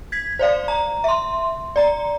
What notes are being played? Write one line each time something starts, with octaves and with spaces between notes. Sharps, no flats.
G#6 B6
C5 D5 F5
A#5
E5 C6
D5 A#5